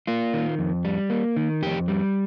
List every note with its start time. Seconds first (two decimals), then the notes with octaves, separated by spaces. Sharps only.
0.07 A#3 F4
0.33 D#3
0.59 F2
0.85 G3
1.10 A#3
1.36 D#3
1.62 F2 G4
1.88 G3